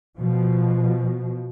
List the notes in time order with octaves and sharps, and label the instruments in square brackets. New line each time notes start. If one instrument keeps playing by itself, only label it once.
[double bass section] B2 F3